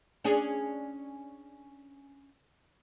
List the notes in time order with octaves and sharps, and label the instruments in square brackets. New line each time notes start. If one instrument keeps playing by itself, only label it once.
[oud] C#4 D4 G#4